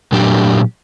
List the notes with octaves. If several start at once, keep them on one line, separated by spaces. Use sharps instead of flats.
A#2 F#3 A3 D4 G4